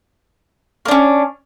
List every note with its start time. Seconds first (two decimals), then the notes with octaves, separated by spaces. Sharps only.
0.85 A#3
0.88 D4
0.91 C#4